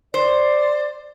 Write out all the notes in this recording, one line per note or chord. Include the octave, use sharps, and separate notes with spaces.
C5 D5